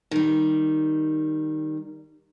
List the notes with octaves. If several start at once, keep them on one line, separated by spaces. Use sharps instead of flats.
D#3 G3